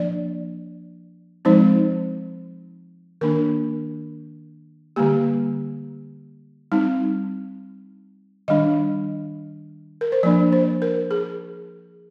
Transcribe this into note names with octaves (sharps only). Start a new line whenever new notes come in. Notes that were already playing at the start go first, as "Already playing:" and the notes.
Already playing: F3 A#3 D4 D5
F3 G#3 C4 D#4 C5
D#3 A#3 D4 A#4
D3 G3 A#3 G4
G3 C4 D#4
D#3 G3 D4 D#5
A#4
C5
F3 A#3 D4 D5
C5
A#4
G#4